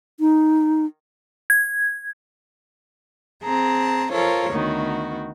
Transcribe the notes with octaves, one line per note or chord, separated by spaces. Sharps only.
D#4
G#6
C4 G#4 A5 A#5
F4 A4 A#4 C5 C#5
D2 D#3 B3 F#4